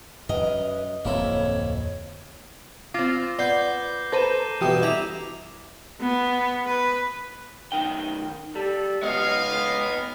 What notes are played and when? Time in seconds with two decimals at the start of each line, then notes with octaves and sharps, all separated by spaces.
0.29 F#2 A#4 B4 D#5
1.05 D1 F2 A#3 C4 E4 A4 C#5
2.94 C4 F4 D6 A#6 C7
3.39 B3 D5 G6 C7 G7
4.12 A4 B4 C5 A#5 G6 D#7 E7
4.61 G2 B2 E3 F3 G4 D#6
4.83 E4 A#5 D6 F7
6.00 B3
6.65 B4
7.72 B1 D#3 G5
8.55 G3 A4
9.03 C#2 B3 C#5 D#5 F5